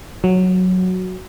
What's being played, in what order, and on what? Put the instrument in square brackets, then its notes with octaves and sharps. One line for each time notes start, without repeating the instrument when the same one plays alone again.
[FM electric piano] F#3